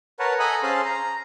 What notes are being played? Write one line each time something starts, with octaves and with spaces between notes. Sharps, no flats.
A#4 B4 C#5 F#5 A5
A4 D#5 G#5 A#5 B5 D#6
C#4 G#4 C5 F5 A5 C6
A#5